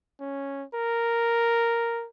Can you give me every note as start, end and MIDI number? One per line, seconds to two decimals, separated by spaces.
0.20 0.65 61
0.74 2.07 70